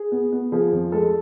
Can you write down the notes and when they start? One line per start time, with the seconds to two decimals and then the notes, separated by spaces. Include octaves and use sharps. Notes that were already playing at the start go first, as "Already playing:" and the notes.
Already playing: G#4
0.12 B3
0.33 B3
0.52 F3 G#4
0.72 F2
0.92 G#3 A4